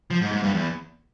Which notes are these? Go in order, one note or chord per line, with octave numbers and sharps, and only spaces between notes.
F3
G#2
G#2
G2
E2